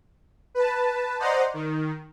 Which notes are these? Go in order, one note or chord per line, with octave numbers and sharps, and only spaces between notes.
B4 A5
C5 D5 D#5 F#5 A#5 C6
D#3